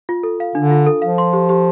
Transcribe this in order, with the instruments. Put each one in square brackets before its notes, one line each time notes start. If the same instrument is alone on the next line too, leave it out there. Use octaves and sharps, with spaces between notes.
[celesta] F4
A4
F5
[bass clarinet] D3 [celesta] D4
[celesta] F4
A4
[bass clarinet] F3 [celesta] F5
[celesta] C6
G4
G4